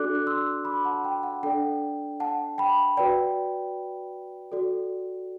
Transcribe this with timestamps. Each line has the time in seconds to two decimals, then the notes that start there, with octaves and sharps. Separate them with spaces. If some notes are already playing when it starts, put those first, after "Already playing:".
Already playing: D4 F#4 A4 D5 D6 F#6
0.15 F#6
0.27 C6 E6
0.65 B5 D6
0.85 F#5 A5
1.04 G5
1.23 F#5
1.43 D4 A4 D5 G5
2.20 F#5 A5
2.58 G5 B5
2.97 F#4 B4 D5 G5
4.52 F#4 A4 D5